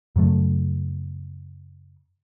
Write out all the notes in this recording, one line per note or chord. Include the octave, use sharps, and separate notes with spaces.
F#2 C#3 F#3 A3